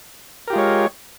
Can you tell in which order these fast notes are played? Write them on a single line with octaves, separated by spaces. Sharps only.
A#4 G4 F4 G#3 C#5